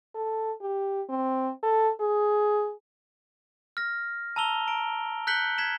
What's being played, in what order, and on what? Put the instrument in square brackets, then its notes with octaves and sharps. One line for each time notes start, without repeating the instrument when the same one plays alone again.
[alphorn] A4
G4
C4
A4
G#4
[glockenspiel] F6 A#6
A5 A#5 E6 F7 G7
A#5 D7
F#6 G6 B6 C#7 F#7 G7
G#6 B6 E7 F#7